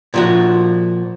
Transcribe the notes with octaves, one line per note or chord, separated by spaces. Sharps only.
A#2 F3 F#4